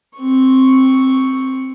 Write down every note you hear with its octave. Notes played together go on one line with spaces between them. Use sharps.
C4 C#6